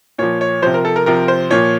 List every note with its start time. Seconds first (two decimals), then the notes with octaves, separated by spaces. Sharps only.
0.18 A#2 F3 C#5
0.41 C#5
0.62 C3 F3 C5
0.74 A#4
0.85 A4
0.96 A#4
1.06 C3 F3 A#4
1.28 C5
1.50 A#2 F3 C#5